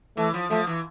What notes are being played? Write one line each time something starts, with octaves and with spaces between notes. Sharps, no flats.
E3 A3
F3
F3 A3
E3